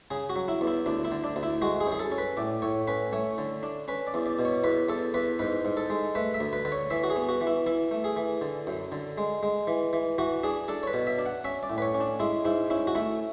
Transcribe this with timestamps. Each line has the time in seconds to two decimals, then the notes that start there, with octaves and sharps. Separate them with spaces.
0.11 C#3 G#4
0.30 F#4
0.36 F#3
0.48 E4
0.61 E2
0.67 E4
0.86 D2 D4
1.05 E4
1.12 D3
1.24 D4
1.36 D2
1.43 E4
1.62 G#3 F#4
1.81 G#4
1.87 F#2
1.92 G#4
1.99 A4
2.12 C#4
2.18 B4
2.37 A2 D5
2.62 A2 C#5
2.87 C#4 B4
3.13 A3 C#5
3.38 D3
3.63 D4
3.88 C#4 B4
4.07 D5
4.14 E2
4.26 D5
4.39 B2
4.45 C#5
4.64 E2 B4
4.89 E2 A4
5.14 E2 B4
5.39 G#2 B4
5.65 G#2
5.77 A4
5.90 G#3
6.15 A3 B4
6.34 E5
6.40 D2
6.53 B4
6.65 D3 B4
6.72 C#5
6.90 E3 E5
7.04 F#4
7.10 G#4
7.16 B3
7.29 F#4
7.41 E3
7.47 E4
7.66 E3 E4
7.91 A3
8.04 G#4
8.17 E3
8.41 D3
8.67 F#2
8.92 D3
9.18 G#3
9.43 G#3
9.67 E3
9.93 E3
10.18 E3 F#4
10.43 D4 G#4
10.68 D4 A4
10.83 C#5
10.87 B4
10.93 B2
11.07 E5
11.19 D4
11.26 F#5
11.44 C#4 E5
11.63 D5
11.70 A2
11.78 B4
11.82 C#5
11.94 C#4
12.00 D4
12.20 G#3 E4
12.45 G#2 E4
12.70 C#4 E4
12.87 F#4
12.95 A3 E4